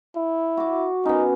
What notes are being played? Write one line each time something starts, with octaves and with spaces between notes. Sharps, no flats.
E4
F#4 D6
B3 C#4 D#4